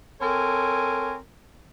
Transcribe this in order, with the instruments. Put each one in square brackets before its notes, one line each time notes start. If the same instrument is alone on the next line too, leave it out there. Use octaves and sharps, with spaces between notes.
[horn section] C4 A4 A#4 C#5 G#5